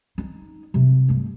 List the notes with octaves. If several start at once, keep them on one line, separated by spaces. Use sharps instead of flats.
D#4
C3 F#3
G2 A3